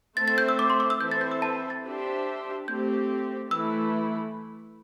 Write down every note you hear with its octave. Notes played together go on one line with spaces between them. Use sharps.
A3 C4 A4 C5 E5 A6
A6
G6
E6
D6
C6
D6
E6
E3 C4 A4 C5 E5 G6
A6
G6
E6
A5
A6
D4 G4 C5 E5
A3 C4 G4 G6
E3 A3 E4 E6